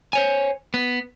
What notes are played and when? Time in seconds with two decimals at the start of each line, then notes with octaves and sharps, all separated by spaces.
0.13 C5 C#5 G#5
0.74 B3